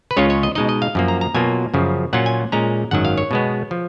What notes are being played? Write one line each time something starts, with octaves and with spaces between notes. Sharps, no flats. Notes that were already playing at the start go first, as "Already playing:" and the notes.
B4
C#2 C#3 G#3 C#4 F4 C#5
C#5
D#5
B2 G#3 D#4 D#5
D#5
F5
F#2 F3 A#3
A#5
A#5
B2 F#3 A#3 F4 G#5
F#2 C#3 F3
A#2 F#3 C#4 F4 F#5
G#5
A#2 G#3 C#4 A#5
G#1 F#2 D#3 F#3 F#5
F5
C#5
B2 G#3 B3
F3